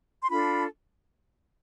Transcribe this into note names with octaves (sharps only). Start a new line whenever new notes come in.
C6
D4 F4 A4 B5